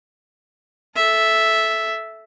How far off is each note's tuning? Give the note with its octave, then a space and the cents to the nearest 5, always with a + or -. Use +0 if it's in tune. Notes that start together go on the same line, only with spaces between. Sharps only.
A4 -15 E5 +0